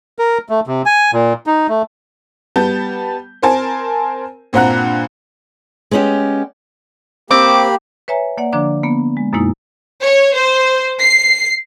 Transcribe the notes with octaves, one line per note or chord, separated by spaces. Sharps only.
A#4
A3
C3
G#5
A#2
D#4
A3
G3 B3 A5 G6
C4 A#4 C5 G#5 A5
G2 A#2 C4 F#5 A#5 F#6
G#3 B3 C#4 E4 G4
A#3 C4 G4 B5 D6
B4 C#5 E5 G#5 A#5
A#3 D5 F#5
D3 F3 D4 D5 A#5 D6
A#3 B3
G#3
F#2 B2 G#3 A#3 D#4 E4
C#5
C5
C7